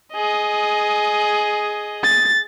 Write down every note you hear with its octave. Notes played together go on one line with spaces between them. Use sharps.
G#4 D#5
A6